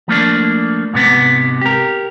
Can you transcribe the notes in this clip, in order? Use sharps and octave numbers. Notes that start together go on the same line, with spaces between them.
F3 A3 A#3 D4
G#2 C3 B3
G4 A#4